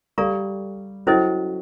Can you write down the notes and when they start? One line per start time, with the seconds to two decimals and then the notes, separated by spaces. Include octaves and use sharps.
0.18 G3 A4 D5 F5 A#5 C#6
1.07 F#3 C#4 E4 A4 C5 D#5